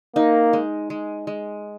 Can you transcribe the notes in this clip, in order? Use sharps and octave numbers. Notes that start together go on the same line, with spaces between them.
A#3 D#4
G#3
G#3
G#3